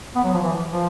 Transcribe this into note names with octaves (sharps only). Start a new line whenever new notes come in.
B3
F#3
F3
E3
F3